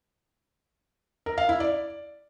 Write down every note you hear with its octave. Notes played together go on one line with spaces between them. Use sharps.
A#4
F5
E4
D5